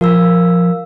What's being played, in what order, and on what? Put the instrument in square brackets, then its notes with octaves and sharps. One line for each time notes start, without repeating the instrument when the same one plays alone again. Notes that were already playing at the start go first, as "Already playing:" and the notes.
[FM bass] F3 [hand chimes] A#4 F5 E6